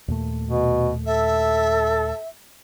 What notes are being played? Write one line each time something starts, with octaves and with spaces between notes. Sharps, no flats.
D#2 A#2 A3
B2
A4 E5